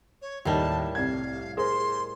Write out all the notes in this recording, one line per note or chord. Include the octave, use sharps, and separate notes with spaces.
C#5
D#2 A2 G3 A#4 D#5 A5
C2 F5 G#6
G#4 A#4 C5 C6